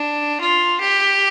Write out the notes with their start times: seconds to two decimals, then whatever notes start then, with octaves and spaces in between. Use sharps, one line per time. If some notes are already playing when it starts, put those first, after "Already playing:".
Already playing: D4
0.41 F4
0.81 G4